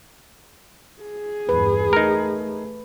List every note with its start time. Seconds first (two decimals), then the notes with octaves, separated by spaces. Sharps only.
1.02 G#4
1.49 E2 G2 B4
1.93 A3 D#4 A#4